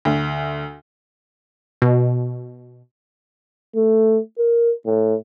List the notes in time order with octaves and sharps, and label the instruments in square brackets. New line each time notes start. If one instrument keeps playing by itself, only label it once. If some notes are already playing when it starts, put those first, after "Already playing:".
[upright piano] D2
[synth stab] B2
[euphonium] A3
A#4
A2